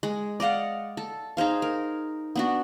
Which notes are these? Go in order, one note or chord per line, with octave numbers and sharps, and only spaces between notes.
G#3
D5 D#5 F5 F#5
A4
D#4 G#4 C5 F5
A#4
B3 D4 F#4